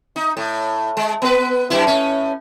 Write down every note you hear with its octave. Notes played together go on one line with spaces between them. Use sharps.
D#4
A2
G#3
B3 B4
F#2 E4
A2 C#4